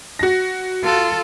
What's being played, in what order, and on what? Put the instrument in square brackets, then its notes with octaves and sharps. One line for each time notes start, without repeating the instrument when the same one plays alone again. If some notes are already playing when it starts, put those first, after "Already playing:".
[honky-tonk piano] F#4 A#6
[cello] F4 A4